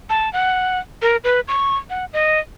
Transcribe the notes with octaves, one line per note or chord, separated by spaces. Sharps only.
A5
F#5
A#4
B4
C#6
F#5
D#5